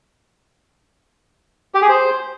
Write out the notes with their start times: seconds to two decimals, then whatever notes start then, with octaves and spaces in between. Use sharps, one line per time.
1.75 G4
1.82 G#4
1.89 C5